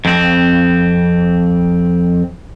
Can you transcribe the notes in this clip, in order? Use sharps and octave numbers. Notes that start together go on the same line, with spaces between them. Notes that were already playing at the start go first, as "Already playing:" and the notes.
F2 C4